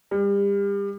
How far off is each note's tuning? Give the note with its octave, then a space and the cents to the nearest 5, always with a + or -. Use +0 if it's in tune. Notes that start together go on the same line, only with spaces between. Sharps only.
G3 +30